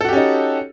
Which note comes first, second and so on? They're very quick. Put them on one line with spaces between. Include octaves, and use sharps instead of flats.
A4 F#4 G4 C#4 D#4